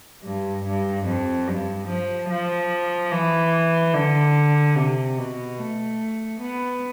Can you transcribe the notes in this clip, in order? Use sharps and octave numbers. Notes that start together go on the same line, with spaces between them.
G2
G2
F2
G2
F3
F3
E3
D3
C3
B2
A3
B3